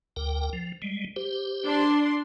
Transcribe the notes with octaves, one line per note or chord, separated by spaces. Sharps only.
D2 A#4 G5
F3
G3 G#3
G4 C5
D4 C6